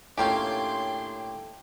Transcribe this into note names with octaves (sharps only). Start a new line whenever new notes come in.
A2 A#3 C#4 D4 F4 G4 G5 C6